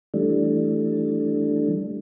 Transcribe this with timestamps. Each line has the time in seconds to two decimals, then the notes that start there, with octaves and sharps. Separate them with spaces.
0.14 E3 G3 A3 D4